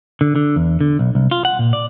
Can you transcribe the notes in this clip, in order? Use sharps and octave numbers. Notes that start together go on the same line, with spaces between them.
D3
D3
E2
D3
B1
C2
F4
F#5
A#2
D5